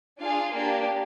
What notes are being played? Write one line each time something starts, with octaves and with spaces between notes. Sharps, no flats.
D4 F4 G#4 F5
A#3 D4 G4